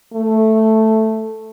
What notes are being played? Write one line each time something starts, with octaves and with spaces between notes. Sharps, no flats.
A3